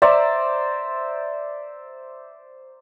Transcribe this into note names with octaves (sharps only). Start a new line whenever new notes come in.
C5 D5 E5 A#5